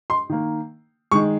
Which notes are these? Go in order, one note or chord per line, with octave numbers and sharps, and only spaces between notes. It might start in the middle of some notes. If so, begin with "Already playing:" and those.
C6
D#3 A#3
D#3 G#3 C#6